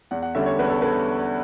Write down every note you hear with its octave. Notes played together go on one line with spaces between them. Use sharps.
E2 F#5
F#5
D3 G3 C#4 E5
C#5
E2 B4
A4
D3 B4